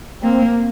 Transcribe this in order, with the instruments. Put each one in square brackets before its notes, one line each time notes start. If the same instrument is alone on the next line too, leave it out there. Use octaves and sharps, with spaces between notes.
[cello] A#3 [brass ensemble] C4